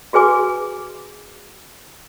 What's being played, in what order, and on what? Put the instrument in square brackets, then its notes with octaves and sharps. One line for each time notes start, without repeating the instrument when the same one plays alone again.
[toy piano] F#4 G#4 B4 G#5 D6